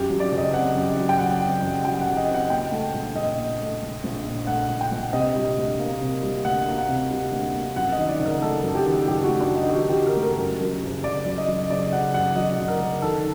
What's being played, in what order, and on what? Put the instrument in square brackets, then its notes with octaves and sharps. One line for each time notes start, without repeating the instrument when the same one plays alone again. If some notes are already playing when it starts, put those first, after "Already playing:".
Already playing: [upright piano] F#2 G4
F#3
D5
F#1
D#5
C4 F#5
F#2
F#3
G5
F#1 F#5
C4
F#2
F#3 G5
F#5
F#1
D#5
C4
F#5
A#2 G5
A3
A#1
A#1 D#5
A#2
A3
A#1
A#1
A#2
A3 F#5
A#1
G5
A#1
C3 D#5
G3
D2
A#3
C3
G3
D2 F#5
A#3
F#5
C3
G3
D2
A#3
F#2 F#5
D#3 D#5
D5
F#1
A#4
A3 A4
F#2
G4
D#3
F#1 G4
F#4
A3
D4
F#2
D#4
G4
D#3 F#4
G4
F#1
A#4
A3
A#4
F#2
F#3
F#1
F#1 D5
F#2
D#5
F#3
F#1 D5
F#1 F#5
F#2 F#5
F#3 D#5
F#1
A#4
F#1
D#3 A4